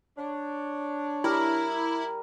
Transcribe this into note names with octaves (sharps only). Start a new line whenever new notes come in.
D4 C#5
G3 E4 A#4